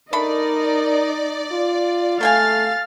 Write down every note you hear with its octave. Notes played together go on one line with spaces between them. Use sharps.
A3 D4 D#4 A#4 D5 D#5 B5
F4
F#3 A3 F5 G5 G#5 F6 A6